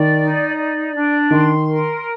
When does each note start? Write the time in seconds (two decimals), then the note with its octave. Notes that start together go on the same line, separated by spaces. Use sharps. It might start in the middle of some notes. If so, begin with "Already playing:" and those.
Already playing: D#3 D5
0.18 D#4
0.56 D5
0.94 D4
1.31 D#3 C6
1.68 A#4